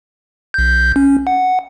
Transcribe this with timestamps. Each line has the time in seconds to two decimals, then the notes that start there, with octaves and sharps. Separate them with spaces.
0.54 B1 G6
0.96 C#4
1.27 F#5